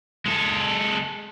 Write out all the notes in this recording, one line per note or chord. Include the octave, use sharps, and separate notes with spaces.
G#3 A4